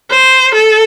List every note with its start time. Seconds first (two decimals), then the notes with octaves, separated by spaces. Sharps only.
0.10 C5
0.53 A4